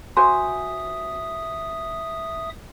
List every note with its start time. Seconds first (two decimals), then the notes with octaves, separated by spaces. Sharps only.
0.17 F#4 C5 E5 G#5 C6 D#6